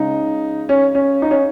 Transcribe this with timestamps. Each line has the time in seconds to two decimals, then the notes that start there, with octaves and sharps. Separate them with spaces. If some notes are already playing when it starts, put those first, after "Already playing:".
Already playing: C#3 G#3 D#4
0.69 C#4
0.95 C#4
1.22 D#4
1.31 C#4